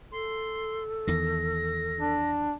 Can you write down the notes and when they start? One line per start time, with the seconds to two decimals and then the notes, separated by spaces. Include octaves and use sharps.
0.12 A4 C6
1.07 E2 D#3 A#6
2.00 D4